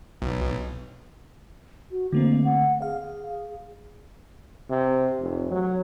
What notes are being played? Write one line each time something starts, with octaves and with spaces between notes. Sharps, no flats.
B1
F#4
D3 A3 A#3 C4
F#5
G#4 F5
C3
F1
F#3